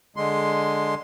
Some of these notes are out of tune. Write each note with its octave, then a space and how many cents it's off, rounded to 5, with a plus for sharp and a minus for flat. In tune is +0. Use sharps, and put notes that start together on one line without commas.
D3 +0 G#3 +0 C6 +0